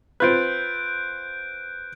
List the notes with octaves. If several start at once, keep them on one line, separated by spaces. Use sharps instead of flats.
C4 F4 B4 F#6 G6 D7